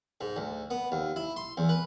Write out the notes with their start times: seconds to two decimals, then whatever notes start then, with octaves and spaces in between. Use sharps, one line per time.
0.21 G#2
0.36 D2
0.70 B3
0.92 D#2
1.16 E4
1.36 C6
1.57 E2
1.69 B4